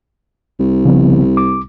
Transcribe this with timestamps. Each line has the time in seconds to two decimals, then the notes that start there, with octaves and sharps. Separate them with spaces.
0.60 C2
0.85 C#3 F3 B3
1.37 D6